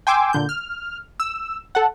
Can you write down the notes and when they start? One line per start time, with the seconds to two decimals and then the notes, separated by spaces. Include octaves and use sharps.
0.07 G5 G#5 C6 D6 E6
0.33 A#2 D3 G6
0.49 F6
1.20 E6
1.75 A4 F#5